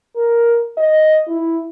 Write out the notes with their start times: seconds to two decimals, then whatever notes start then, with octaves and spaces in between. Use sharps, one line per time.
0.16 A#4
0.77 D#5
1.27 E4